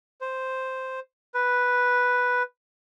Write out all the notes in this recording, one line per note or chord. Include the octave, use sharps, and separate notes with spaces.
C5
B4